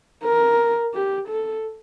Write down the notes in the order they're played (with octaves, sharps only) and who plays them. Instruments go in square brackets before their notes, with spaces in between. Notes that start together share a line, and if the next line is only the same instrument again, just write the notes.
[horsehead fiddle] A#4
G4
A4